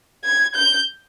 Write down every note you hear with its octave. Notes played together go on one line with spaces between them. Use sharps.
G#6
G6